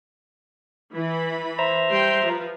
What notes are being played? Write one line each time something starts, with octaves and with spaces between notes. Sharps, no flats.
E3 B5
C5 E5 A#5
G3 G5 C6
F3 B4